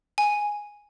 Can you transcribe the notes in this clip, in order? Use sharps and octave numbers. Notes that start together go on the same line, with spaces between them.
G#5